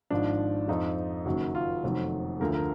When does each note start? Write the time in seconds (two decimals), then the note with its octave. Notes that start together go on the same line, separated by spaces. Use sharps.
0.10 G#1 G#2 F3 D4
0.68 F2 F3 D#4
1.25 F#1 F#2 D#3 F#3
1.55 F4
1.83 F1 F2 D#3 F#3
2.40 D2 D3 F3 A#4
2.55 A#4